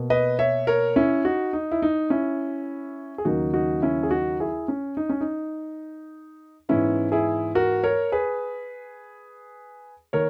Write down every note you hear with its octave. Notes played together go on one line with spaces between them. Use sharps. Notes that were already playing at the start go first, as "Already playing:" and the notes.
Already playing: B2 A#3
B4 D#5
C#5 E5
A#4 C#5
C#4 E4
D#4 F#4
D#4
E4
D#4
C#4 E4
G#4
D#2 C#3 F#3 A#3 D#4 F#4
D#4 F#4
C#4 E4
G#4
D#4 F#4
E4 G#4
C#4
D#4
C#4
D#4
G#2 E3 B3 C#4 E4
E4 G#4
F#4 A#4
A#4 C#5
G#4 B4
D#3 A#3 A#4 C#5